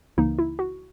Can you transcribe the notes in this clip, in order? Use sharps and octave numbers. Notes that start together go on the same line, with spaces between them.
C#2 C#3 E3 A#3 D#4
E4
F#4